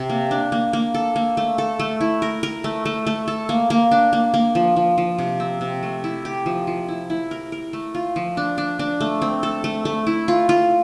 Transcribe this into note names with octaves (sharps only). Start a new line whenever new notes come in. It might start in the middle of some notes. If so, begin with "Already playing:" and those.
Already playing: C3
A#3
D4
A#3
A#3
A4
A#3
A3
A4
A3
E4
A#4
A#4
A3
A3
A3
A4
A#3
A#3
D4
A#3
A#3
F3
F3
F3
C3
C4
C3
A3
E4
G4
F3
F3
E4
E4
A#4
A#4
A3
F4
F3
D4
D4
D4
A3
C4
A4
A3
A3
E4
F4
F4